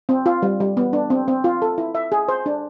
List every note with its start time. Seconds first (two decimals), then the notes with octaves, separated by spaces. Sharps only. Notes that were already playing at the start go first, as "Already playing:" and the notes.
0.09 C4
0.26 F4
0.42 G3
0.60 G3
0.77 B3
0.93 D4
1.10 C4
1.28 C4
1.44 F4
1.62 A4
1.78 E4
1.95 E5
2.12 G#4
2.28 C5
2.46 D4